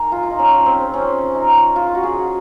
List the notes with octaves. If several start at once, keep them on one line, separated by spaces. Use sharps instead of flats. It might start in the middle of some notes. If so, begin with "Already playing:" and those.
Already playing: D#4 G#4 A#4
F4
F4
D#4
C#4
C4
C#4
D#4
F4
F#4
G#4